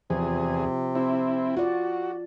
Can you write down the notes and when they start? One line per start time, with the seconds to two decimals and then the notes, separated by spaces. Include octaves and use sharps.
0.10 E2 C3 F3 G#4
0.95 C4 E4
1.57 F4 F#4 D5